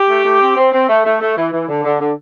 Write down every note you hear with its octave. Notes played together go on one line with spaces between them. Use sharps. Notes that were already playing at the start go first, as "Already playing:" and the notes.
Already playing: G4
A3
A3
C4
C4
C4
A3
A3
A3
E3
E3
D3
D3
D3